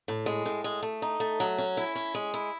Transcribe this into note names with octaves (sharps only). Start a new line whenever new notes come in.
A2
G#3
A2
G#3
A3
D#4
A3
F#3
C#4
E4
C#4
G#3
E4